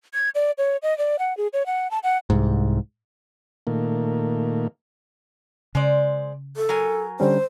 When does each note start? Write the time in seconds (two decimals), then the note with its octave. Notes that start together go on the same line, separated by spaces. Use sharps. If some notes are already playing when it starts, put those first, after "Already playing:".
0.14 G#6
0.35 D5
0.58 C#5
0.83 D#5
0.98 D5
1.19 F#5
1.37 G#4
1.53 C#5
1.66 F#5
1.91 A5
2.04 F#5
2.30 C2 G#2
3.67 A#2 D#3 A3 A#3
5.75 C#3 G#3 C5 D5
6.57 A4
6.69 F#3 A#4 G#5
7.20 D3 G3 C#4 C5